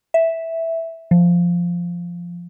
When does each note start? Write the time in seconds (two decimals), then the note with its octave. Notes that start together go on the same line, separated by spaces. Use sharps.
0.14 E5
1.11 F3